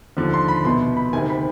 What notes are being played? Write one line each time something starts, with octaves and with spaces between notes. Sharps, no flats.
D#2 D3 F3
C6
B5
C2 B2 C6
B5
D2 C3 D#3 G#5
B5